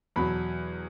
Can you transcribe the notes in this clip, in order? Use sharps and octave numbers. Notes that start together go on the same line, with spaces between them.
E2 B2 F#3 B5